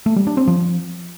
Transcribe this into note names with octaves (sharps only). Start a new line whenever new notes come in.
A3
G3
D4
C4
F3